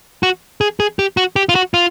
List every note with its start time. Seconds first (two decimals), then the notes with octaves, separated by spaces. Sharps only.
0.23 F#4
0.61 G#4
0.80 G#4
0.99 G4
1.17 F#4
1.36 G4
1.49 F4
1.55 F#4
1.74 F4